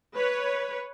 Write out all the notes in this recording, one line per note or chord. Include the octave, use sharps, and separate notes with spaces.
B4 C#5